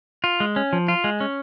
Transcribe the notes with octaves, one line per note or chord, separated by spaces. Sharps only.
F4
G#3
C#4
F3
F4
G#3
C#4